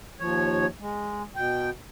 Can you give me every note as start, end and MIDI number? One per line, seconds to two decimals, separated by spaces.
0.20 0.66 39
0.20 0.66 53
0.20 0.66 73
0.80 1.23 56
1.36 1.70 47
1.36 1.70 79